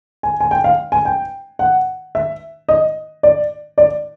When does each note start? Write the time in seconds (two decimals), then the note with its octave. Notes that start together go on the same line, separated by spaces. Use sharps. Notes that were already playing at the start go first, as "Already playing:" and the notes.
0.23 G#5
0.40 G#5
0.51 G5
0.64 F5
0.92 G#5
1.05 G5
1.59 F#5
2.15 E5
2.69 D#5
3.23 D5
3.78 D5